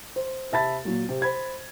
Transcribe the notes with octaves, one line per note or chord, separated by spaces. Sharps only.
C5
C3 E5 A5 B5 A6
A#2 F#3
C3
C5 B5 G#6